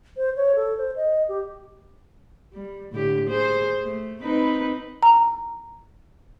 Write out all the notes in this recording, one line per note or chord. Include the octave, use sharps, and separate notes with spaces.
C5
C#5
A4
C5
D#5
G4
G3
A2 D3 G4
G#4 C5
A3
C4 D#4 B4
A#5